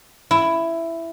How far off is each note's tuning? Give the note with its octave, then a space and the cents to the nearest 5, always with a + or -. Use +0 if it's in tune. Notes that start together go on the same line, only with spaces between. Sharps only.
E4 +10